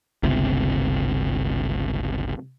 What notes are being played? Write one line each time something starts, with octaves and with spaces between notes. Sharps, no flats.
G1 C#2 C3